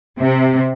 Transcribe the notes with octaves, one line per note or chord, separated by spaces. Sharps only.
C3